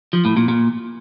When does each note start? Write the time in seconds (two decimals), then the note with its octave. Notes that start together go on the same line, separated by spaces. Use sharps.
0.13 F3
0.25 A2
0.37 A#2
0.48 A#2